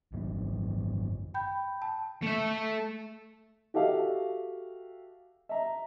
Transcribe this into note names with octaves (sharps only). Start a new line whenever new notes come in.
G#1 F#2
G5 B5 G6
A5
A3 E5
F#4 G4 A4 E5 F5
E5 A#5